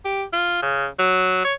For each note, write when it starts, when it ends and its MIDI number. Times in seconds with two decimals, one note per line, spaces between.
0.05 0.23 67
0.33 0.60 65
0.62 0.86 49
0.99 1.41 54
1.44 1.53 73